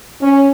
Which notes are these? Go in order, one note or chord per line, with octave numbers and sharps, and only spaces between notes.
C#4